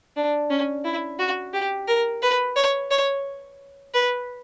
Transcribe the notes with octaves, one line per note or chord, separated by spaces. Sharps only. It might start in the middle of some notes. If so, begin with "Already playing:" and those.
D4
C#4
E4
F#4
G4
A#4
B4
C#5
C#5
B4